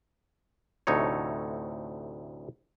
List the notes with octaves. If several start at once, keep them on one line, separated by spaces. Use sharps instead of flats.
D2 A2 C3 D#4 A4 C#5